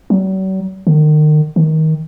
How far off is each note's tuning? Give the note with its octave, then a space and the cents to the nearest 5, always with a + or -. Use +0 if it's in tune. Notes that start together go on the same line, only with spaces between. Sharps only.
F#3 +45
D#3 -35
D#3 +20